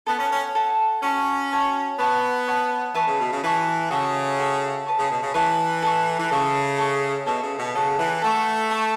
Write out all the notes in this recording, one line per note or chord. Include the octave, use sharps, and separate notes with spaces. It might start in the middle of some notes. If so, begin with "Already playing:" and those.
B3 A4 F#5 A5
C#4
C#4
A4 F#5 A5
C#4 F#4 C#5 A5 C#6
F#4 C#5 A5 C#6
B3 C#5 F#5 A5 C#6
C#5 F#5 A5 C#6
E3 B4 E5 A5 C#6
C#3
B2
C#3
E3 B4 E5 A5 C#6
C#3 F#4 A4 E5
F#4 A4 E5
B4 A5 C#6
C#3
B2
C#3
E3 B4 A5 C#6
A4 E5 C#6
E3
C#3 A4 E5 C#6
A4 E5 C#6
B2 A4 E5 C#6
C#3
B2
C#3 A4 F#5 C#6
E3
A3 A4 F#5 C#6
A4 E5 A5 C#6